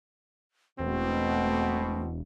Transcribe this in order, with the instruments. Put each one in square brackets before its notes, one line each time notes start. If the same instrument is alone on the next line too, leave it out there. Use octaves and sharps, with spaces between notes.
[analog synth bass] E1 [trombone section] B2 [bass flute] A3 [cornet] C4